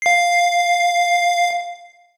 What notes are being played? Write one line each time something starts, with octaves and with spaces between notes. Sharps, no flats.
F5 C7